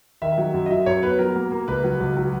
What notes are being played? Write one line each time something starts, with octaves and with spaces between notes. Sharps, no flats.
D#3 E5
F#3
F#2
D#5
F#3 E5
F#2 C#5
B3 B4
F#3 A#4
A#3
A#3
C#2 B4
F#3
C#2
F#3